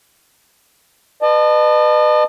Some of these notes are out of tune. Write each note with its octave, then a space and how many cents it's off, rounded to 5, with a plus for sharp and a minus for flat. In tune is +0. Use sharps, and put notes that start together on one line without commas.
B4 +0 D#5 -40 A5 +0